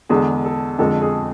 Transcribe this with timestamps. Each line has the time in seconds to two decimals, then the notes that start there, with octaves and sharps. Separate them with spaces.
0.09 E2 D3 G#3 G#4
0.44 A4
0.79 F2 D3 G#3 A4
1.02 G#4